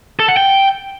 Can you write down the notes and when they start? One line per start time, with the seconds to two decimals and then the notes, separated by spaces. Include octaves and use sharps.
0.20 A4
0.28 F#5
0.37 G5